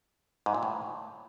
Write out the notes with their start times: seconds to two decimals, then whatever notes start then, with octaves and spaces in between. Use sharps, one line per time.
0.46 G#2
0.54 A#2
0.63 A2